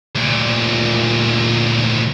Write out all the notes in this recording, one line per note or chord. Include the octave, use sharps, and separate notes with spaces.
D2 A#2